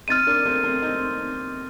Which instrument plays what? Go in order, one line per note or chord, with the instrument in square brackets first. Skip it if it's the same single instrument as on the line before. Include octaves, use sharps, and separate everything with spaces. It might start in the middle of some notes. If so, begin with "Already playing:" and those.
[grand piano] C4 D#4 [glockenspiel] F6 A6 D#7
[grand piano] A#3 D4
A3 C4
A3 C4
C4 D#4